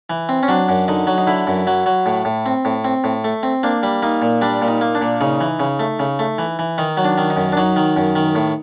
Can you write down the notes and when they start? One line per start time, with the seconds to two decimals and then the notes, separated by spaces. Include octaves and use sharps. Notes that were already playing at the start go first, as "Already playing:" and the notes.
0.10 E3
0.29 C4
0.43 C#4
0.48 F#3 D4
0.69 F#2
0.88 D3 D#4
1.07 F#3
1.18 D#4
1.27 D3 E4
1.47 F#2
1.67 F#3
1.86 F#3
2.06 A2
2.25 A2
2.46 C4
2.65 A2
2.85 C4
3.04 A2
3.24 A3
3.43 C4
3.63 A#3 D4
3.83 G3
4.03 A#3 D#4
4.22 A#2
4.42 G3 D4
4.62 A#2
4.68 D#4
4.81 A#3
4.95 D4
5.01 A#2
5.21 C#3 D#4
5.41 E3
5.60 C#3
5.79 A3
6.00 C#3
6.19 A3
6.38 E3
6.59 E3
6.78 D#3 D#4
6.97 F#3
7.05 D4
7.18 D#3
7.30 D#4
7.36 F#2
7.52 D4
7.57 F#3 D#4
7.76 D#3
7.96 F#2
8.15 D#3
8.35 A2